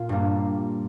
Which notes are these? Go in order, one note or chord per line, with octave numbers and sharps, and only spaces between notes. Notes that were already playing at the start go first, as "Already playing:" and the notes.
Already playing: A#2 F4
G2 G3 A#3